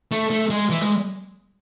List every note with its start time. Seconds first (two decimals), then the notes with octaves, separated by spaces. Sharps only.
0.12 A3
0.30 A3
0.50 G#3
0.70 E3
0.81 G#3